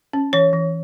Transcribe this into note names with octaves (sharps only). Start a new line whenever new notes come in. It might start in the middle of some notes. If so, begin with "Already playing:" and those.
C#4
E3 C#5
E3